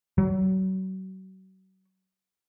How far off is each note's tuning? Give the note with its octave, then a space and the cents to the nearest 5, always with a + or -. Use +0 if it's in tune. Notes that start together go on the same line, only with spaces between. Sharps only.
F#3 +35